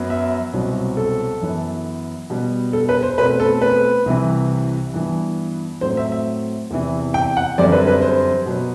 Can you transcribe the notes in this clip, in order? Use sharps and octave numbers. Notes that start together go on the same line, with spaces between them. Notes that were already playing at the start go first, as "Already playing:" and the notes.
Already playing: F#2 F#3 B3
E5
C2 B2 F#3 C4
A4
F#2 E3 B3
B2 G3 B3
A4
B4
C5
B2 A3 C4 B4
A4
B4
C2 C3 E3
G2 E3 B3
A2 F#3 C4 C5
E5
E5
E2 C3 E3
G5
F#5
F#2 D3 G3 C4 D5
B4
B4
C5
B2 F#3 B3